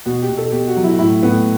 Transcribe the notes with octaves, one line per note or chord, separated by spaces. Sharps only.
B2 F#4
G4
B2
A4
B2 G4
F#4
F#3
E4
A2 E4
A2 B3